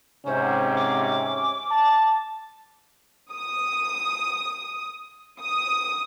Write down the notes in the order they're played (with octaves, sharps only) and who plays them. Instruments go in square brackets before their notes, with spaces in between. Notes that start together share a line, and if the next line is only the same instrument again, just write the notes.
[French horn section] G#2 C3 [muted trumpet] C#4 [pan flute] C5
[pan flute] D6
[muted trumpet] A5
[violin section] D#6
D#6